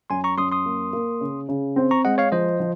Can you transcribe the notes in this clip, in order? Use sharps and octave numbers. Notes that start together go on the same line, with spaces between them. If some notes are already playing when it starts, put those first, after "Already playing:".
F#2 G#5 C6
A#5 C#6
F#2 C6 D#6
C6 D#6
A#3
A#3
C#3
C#3
C4
A#5 C#6
G#3 D#5 F#5
C#5 F5
F3 C5 D#5
F3